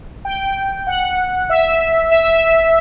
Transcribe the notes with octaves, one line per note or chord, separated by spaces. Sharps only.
G5
G5
F#5
E5
E5